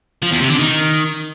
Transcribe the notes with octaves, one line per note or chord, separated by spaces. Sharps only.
F3
E2
C3
D3
D#3